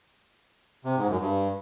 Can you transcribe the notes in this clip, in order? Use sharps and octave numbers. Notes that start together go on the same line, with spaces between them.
C3
G#2
F#2
G2